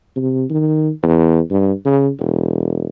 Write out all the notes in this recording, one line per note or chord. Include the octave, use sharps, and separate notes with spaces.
C3
D#3
E2
G2
C#3
E1